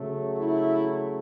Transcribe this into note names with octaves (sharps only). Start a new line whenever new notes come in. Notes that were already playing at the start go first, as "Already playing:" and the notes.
Already playing: C#3 F#3 A3
E4